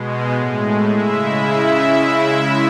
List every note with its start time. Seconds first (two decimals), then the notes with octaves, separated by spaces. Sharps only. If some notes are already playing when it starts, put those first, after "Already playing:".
Already playing: B2 G#3
0.32 A2 G#3
0.89 C#3 G#3 E4 E5
1.16 E4 E5